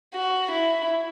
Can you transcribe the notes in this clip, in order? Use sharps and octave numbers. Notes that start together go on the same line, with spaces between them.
F#4
E4